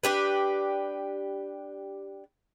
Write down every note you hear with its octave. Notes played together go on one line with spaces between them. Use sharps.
D4 G4 B4